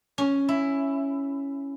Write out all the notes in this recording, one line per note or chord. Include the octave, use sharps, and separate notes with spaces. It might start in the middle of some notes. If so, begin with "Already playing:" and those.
C#4
E4